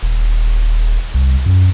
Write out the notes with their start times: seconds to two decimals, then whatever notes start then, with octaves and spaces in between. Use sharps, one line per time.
0.03 D#1
1.14 C2
1.46 F#2